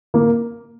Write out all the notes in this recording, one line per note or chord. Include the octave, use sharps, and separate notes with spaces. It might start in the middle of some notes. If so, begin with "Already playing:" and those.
A#3